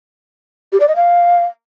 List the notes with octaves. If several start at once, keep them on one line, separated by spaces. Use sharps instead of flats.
G4
D5
D#5
F5